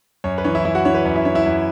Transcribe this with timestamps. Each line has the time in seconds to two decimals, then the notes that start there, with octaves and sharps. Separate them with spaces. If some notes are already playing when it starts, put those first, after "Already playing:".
0.24 F#2 C#5
0.38 B4
0.44 E3 C#5
0.55 E4 E5
0.65 F#2 E4 E5
0.75 F#4 F#5
0.85 E3 C#5
0.95 B4
1.05 F#2 C#5
1.16 E4 E5
1.25 E3 C#5
1.35 E4 E5
1.46 F#2